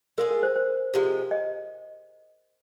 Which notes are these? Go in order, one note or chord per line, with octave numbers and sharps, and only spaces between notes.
G#3 F4 G#4 A#4
A#4
C5
C5
C3 F3 G#3
D#5